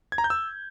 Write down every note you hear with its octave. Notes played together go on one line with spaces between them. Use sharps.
G#6
A#5
G6
E6